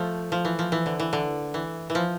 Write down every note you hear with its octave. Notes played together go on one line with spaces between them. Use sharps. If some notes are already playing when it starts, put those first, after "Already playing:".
Already playing: F3 A3
F3
E3
F3
E3
D3
E3
D3
E3
E3
F3